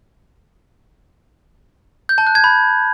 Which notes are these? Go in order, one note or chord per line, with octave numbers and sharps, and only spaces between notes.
G6
A5
F#6
G#6
B5